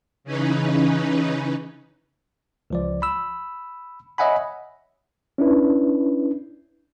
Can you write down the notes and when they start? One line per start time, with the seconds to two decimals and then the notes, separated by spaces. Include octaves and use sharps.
0.24 C#3 E3 C#4 D#4 B4
2.70 C#2 F3 D5
3.02 B5 E6
4.18 C#5 D#5 E5 F#5 G#5 B5
5.38 C#4 D4 E4 B4